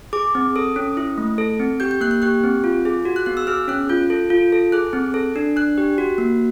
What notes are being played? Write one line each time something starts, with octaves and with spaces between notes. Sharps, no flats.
G#4 D6
C4
A4 D#6
C#4
E4
A3
A4
C4
G4 G6
G6
A#3 F#6
F#6
G4 F#6
C4
F4
G#4
F#4
F#6
B3 F#6
E6
G#4 F6
C#4 F#6
F4 G6
A4
F4
A4
G#4 F#6
C4
A4
D4
D4 F#6
G4
F#4
A#3